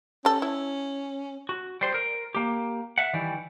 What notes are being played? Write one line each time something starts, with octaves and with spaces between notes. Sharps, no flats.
C#4 G4 A4
E4
F#4
G3 C5 C6
A#4
A#3 G4
E5 F#5
D#3 E3 G3